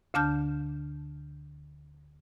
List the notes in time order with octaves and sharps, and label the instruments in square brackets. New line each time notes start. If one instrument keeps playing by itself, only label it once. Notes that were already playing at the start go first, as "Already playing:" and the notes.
[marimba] D2 D3 D4 A5 F6 G6